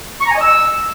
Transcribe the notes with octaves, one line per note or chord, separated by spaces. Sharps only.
C#6
A#5
G#5
D#5
E6